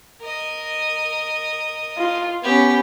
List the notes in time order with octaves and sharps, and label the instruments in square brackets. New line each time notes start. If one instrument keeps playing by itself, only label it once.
[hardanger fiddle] A#4 D#5
[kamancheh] F4
[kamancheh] B3 C#4 [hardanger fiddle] G4